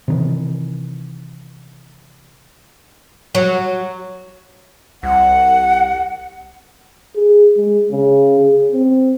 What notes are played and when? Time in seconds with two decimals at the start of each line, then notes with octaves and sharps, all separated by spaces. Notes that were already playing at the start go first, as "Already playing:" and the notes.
0.08 C3 D#3 E3
3.35 F#3
5.03 C2 F#5
7.15 G#4
7.57 G#3
7.91 C#3
8.40 G#4
8.72 C4